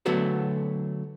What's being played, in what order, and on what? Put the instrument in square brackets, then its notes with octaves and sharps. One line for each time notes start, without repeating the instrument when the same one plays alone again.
[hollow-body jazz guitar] D3 F#3 A3 B3 F#4 A4